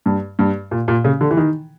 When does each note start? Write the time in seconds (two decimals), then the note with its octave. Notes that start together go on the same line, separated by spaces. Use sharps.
0.06 G2
0.39 G2
0.71 A#2
0.88 A#2
1.05 C#3
1.21 D3
1.31 E3
1.37 D#3